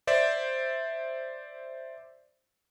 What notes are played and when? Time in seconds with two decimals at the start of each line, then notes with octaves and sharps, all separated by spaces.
0.07 C5 D5 E5